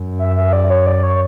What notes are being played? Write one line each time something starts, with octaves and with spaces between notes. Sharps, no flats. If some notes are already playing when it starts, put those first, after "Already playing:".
Already playing: F#2
E5
E5
D5
C#5
D5
C#5